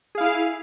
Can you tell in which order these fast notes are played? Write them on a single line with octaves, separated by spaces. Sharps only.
G#4 F5 E4